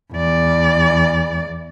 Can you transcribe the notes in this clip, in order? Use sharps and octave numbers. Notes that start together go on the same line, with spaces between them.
E2 D5